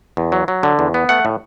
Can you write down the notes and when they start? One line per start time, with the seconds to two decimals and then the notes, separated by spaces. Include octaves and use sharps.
0.17 E2
0.32 F#3
0.48 F#3
0.63 D3
0.79 E2
0.94 B3
1.09 A3 F#5
1.25 A2